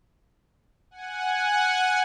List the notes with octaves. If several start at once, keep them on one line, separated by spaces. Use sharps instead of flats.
F#5 G#5